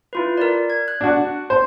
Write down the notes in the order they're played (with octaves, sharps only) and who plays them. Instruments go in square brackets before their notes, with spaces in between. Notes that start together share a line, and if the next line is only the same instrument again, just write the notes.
[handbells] E4 F4 B4
A#4 D5
G#6
F#6
[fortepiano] D4 F#4
C5